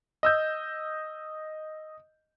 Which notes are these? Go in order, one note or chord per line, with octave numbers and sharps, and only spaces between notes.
D#5 E6 G6